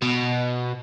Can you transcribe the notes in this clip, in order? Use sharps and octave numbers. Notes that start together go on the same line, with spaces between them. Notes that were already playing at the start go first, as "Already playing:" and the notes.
B2